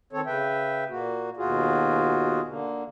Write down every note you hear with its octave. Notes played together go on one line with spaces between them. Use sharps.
D#3 C4 A4 C#5
C#3 B4 E5 G5
A#2 A#3 F#4
D#2 B2 F4 F#4 G#4
D3 A#3